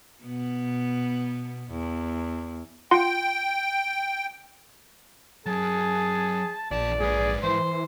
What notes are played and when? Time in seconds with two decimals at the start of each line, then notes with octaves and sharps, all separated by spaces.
0.23 B2 B3
1.70 E2
2.91 F4 F#5 G5 C6
5.46 F#3 G#4 A#4 A5
6.71 A#1 E2 D5 A5
7.00 A#1 G#2 G#4 B4
7.43 E3 C5 C6